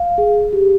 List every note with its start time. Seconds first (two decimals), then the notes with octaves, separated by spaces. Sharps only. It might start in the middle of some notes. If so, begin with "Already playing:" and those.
Already playing: F5
0.18 G#4
0.53 G4